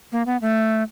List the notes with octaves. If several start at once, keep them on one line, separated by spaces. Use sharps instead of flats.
A#3
B3
A3